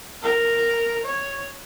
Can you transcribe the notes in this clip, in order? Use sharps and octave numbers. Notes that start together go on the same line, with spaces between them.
A#4
C#5